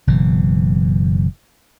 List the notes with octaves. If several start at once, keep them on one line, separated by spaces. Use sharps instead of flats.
F#1 B2 E3